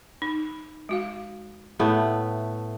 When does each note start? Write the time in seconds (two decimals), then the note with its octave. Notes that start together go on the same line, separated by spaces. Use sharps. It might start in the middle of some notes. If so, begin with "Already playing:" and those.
0.22 D#4
0.89 G#3 F#4 F5
1.79 A2 A3 B3